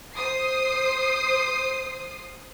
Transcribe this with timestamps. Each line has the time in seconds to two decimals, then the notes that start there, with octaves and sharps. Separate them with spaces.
0.13 C5 D#6 C7